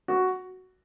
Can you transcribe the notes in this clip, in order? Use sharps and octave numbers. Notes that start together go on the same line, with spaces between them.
F#4